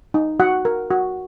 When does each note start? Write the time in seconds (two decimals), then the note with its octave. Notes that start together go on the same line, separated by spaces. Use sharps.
0.14 D#4
0.40 F#4 F#5
0.65 A#4
0.91 F#4